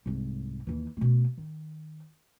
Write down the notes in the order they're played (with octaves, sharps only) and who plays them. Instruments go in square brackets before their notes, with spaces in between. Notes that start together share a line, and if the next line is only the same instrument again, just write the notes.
[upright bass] C2 G#2
D#2 E3
B2 A3
D#3